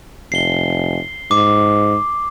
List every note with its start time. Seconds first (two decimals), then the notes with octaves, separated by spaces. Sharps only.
0.32 F1 C7 G7
1.31 G#2 D6